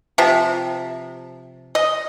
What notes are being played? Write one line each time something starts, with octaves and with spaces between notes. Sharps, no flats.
C3 F3
D#5